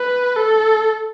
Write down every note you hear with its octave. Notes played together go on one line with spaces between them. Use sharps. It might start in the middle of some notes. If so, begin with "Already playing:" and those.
Already playing: B4
A4